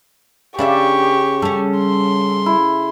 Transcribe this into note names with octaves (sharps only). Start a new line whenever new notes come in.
C#3 D4 G4 D5 E5 C#6
G3 C#4 A4
C6
E4